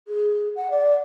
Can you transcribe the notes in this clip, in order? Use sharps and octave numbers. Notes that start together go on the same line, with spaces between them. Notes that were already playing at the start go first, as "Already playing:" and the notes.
G#4
F#5
D5